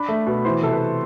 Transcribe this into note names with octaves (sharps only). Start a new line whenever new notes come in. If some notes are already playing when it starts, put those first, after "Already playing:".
Already playing: D4 B5
A3
B2
E3 C5
C3 A4
B4